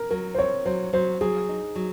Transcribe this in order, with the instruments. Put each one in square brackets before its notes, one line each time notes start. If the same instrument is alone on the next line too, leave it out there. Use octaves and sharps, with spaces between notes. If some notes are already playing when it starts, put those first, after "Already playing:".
Already playing: [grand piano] A#4
[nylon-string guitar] F#3 [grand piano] A#4
[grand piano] C5
[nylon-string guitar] C4 [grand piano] C#5
[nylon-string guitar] F#3 [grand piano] C5
[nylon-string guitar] F#3 [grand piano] C5
[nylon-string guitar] F#3 [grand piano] G#4
[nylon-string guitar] D#4
F#3